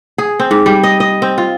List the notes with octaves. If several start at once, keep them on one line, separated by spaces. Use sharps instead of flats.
G#4
C4
G#2
G3
D#5
D#5
C4
F4